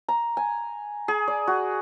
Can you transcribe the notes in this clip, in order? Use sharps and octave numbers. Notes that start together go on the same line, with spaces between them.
A#5
G#5
G#4
D5
F#4